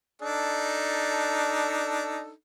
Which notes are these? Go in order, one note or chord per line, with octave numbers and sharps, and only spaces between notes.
D4 D#4 A4